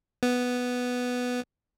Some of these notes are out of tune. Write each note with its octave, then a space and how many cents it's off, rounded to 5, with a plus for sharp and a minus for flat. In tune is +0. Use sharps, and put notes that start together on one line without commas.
B3 +0